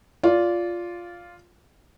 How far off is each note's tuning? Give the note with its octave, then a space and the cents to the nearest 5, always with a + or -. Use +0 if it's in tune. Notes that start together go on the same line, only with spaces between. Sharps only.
F4 +0 D5 -20